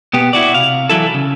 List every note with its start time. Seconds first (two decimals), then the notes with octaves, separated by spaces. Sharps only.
0.13 B2 B3 G4
0.33 E4 F#4 D5
0.54 C3 F5
0.89 E3 F#3 E4 A4
1.14 C#3